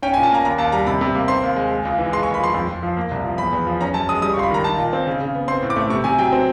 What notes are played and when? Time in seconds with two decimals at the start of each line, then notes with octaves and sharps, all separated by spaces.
0.02 C#4 G5
0.14 G#5
0.17 A#2
0.23 A5
0.31 A#3 A#5
0.45 D#2 A#5
0.58 D#2 A5
0.72 G3 A#5
0.87 C3 B5
1.01 C3
1.15 A#3
1.28 C4 C6
1.43 D#2
1.56 G#3
1.71 G#3
1.85 C#2
1.98 E3
2.13 G#3 C6
2.23 C#6
2.27 D#2
2.34 B5
2.40 F3 C6
2.54 F2
2.68 F2
2.83 F3
2.97 A#3
3.11 C2
3.24 F3
3.38 E2 B5
3.53 E2
3.67 F3
3.81 C#4 A#5
3.94 F#2 A5
4.09 G#3 D#6
4.22 G3 D#6
4.34 C#6
4.37 C#2 C6
4.43 B5
4.50 D#3 A#5
4.64 D#4 A5
4.78 A#2
4.93 C4
5.07 C#3
5.21 C#3
5.35 B3
5.48 C4 C6
5.62 A2
5.70 D6
5.76 A3
5.90 C3 C#6
6.04 C3 G#5
6.18 F#3 G5
6.33 C4